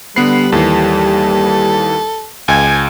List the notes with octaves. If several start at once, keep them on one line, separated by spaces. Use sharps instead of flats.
D3 G3 B3 B4 C7
D#2 E3 A4
C#2 G#5